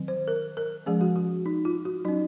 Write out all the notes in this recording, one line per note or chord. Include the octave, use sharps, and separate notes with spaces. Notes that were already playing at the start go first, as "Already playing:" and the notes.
Already playing: D#3 F#3 C4
C5
A#4
A#4
F3 G#3 C#4 G#4
F#4
F#4
D#4
F4
F#4
F#3 C#4 D#4